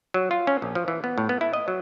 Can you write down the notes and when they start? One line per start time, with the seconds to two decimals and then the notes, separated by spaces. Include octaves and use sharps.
0.14 F#3
0.31 F4
0.47 C#4
0.62 A#1
0.75 F3
0.88 E3
1.04 B3
1.18 A2
1.29 B3
1.41 E4
1.53 D#5
1.68 F#3